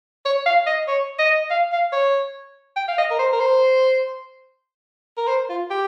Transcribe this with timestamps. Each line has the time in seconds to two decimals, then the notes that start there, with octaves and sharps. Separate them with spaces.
0.25 C#5
0.46 F5
0.67 D#5
0.88 C#5
1.19 D#5
1.51 F5
1.72 F5
1.92 C#5
2.76 G5
2.88 F5
2.98 D#5
3.10 A#4
3.19 C5
3.33 A#4
3.40 C5
5.17 A#4
5.28 C5
5.50 F4
5.71 G4